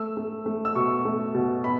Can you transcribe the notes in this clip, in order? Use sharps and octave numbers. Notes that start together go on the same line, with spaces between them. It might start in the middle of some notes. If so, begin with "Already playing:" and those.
Already playing: A3 E6
A3
A3
E6
B2 C#6
A3
B2
B3 B5